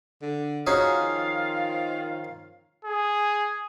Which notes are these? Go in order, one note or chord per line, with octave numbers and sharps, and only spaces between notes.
D3
F3 C#4 D#4 F4 F#4 G#4 F5
D#3
G#4